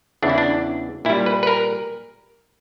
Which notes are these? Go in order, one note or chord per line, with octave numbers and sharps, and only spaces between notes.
E2 C#3 E3 D4
E4
D4
A#2 G3 E4
B4
B4
A#4